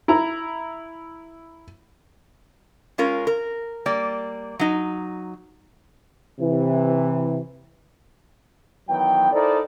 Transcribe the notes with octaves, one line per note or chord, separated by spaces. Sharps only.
E4 A#5
G#3 C#4 F4 A#4
A#4
G3 A#3 D5
F#3 D#4
C3 E3
D#3 E3 F#3 B3 G5
D#4 E4 A4 A#4 C5 D5